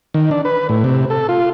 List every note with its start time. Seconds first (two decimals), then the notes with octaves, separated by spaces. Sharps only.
0.14 D#3
0.31 D4
0.45 B4
0.69 A2
0.84 C3
1.10 A4
1.29 F4